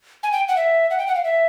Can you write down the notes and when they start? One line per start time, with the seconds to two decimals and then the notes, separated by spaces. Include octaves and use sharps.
0.23 G#5
0.32 G5
0.48 F#5
0.57 E5
0.90 F#5
0.99 G5
1.07 F#5
1.15 F5
1.24 E5